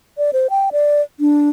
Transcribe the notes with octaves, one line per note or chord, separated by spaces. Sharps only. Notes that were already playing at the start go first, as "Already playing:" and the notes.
D5
C5
G5
D5
D4